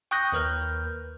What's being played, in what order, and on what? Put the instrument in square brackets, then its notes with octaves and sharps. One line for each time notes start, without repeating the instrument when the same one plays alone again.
[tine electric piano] G5 C#6 D#6 F#6 G6 A#6
D#2 A#4 B4 F6 G6